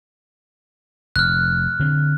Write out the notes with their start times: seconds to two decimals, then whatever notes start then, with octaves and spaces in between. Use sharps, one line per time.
1.16 F1 F6 F#6
1.79 D3 C4